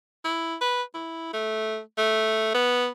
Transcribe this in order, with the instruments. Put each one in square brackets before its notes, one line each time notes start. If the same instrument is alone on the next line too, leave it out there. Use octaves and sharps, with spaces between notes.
[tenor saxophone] E4
B4
E4
A3
A3
B3